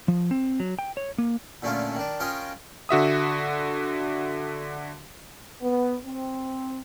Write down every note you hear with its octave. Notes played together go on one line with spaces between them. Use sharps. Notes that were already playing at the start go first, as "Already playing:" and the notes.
F3
C4
F#3
G5
C#5
A#3
A#2 D3 A3 C#4 F4
D#3 D4
C#4 F4 A#4 D#5 G5
D3 F#4 E5 D#6
B3
C4